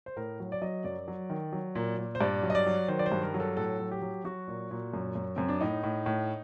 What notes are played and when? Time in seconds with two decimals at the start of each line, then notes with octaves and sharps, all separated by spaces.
0.06 C5
0.17 A2 A#4
0.40 F#3
0.52 D5
0.62 F#3 D#5
0.84 F#2 D5
1.08 F#3
1.30 D#3
1.53 F#3
1.75 A#2
1.98 A#2
2.15 C5
2.21 G2 D5
2.43 F#3
2.50 D#5
2.55 D5
2.67 F#3
2.88 D#3 C5
2.99 D5
3.06 C5
3.12 G2
3.23 A#4
3.34 F#3 A#4
3.40 A4
3.57 A2 A4
3.79 F#3
3.91 G4
4.02 F#3
4.24 F#3 F#4
4.48 A#2
4.71 A#2
4.94 F#2
5.15 F#2
5.36 F#2 C4
5.48 D4
5.61 A2 D#4
5.83 A2
6.06 A2